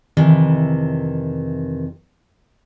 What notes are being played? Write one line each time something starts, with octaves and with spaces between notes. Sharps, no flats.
F2 C3 D#3 E3